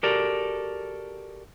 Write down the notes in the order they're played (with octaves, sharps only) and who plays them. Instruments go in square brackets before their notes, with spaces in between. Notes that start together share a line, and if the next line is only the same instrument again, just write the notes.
[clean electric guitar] F#4 G4 A4 A#4 D5